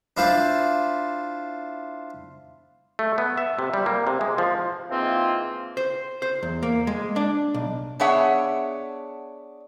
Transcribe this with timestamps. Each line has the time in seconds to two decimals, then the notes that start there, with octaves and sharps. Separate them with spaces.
0.17 D4 E4 F4 C5 D5
2.99 A3
3.18 B3
3.37 E5
3.59 C3
3.74 G3
3.86 A#3
4.07 C3
4.21 G#3
4.38 F3
4.90 G#2 E3 F3 A#3 C4 F4
5.77 C5
6.22 C5
6.43 E2
6.63 A#3
6.87 G#3
7.16 D4
7.54 B1
8.00 B3 D4 G#4 C#5 E5 F#5